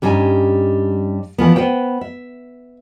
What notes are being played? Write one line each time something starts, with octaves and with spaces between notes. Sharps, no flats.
G2 G3 C#4 D#4 G#5
E3 F3 B3
B3 B4 C5 G5
E5